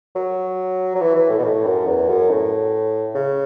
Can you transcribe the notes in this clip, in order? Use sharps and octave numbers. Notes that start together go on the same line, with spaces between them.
F#3
F#3
E3
E3
A2
B2
A2
F#2
E2
F#2
A2
C#3